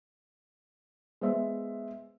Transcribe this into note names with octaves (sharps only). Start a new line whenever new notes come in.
G#3 B3 C5 E5